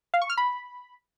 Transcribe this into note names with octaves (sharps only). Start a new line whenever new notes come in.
F5
C#6
F6
B5